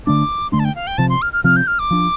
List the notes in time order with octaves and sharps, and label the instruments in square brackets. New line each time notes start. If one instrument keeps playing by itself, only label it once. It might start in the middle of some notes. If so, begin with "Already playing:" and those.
[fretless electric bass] D3 A3 D4 [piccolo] D6
[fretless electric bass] D3 A3 D4 [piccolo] C6
[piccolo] A5
G5
F5
G5
[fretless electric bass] C3 F3 C4 [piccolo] A5
[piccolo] C6
F6
F6
[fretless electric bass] C3 F3 C4 [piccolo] F6
[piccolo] G6
F6
D6
[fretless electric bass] F3 D4